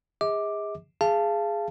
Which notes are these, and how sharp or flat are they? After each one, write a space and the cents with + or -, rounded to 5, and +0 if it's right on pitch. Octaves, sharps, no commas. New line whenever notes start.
G#4 -30 D#5 +45 D6 +5
G#4 +0 F5 -25 A5 +0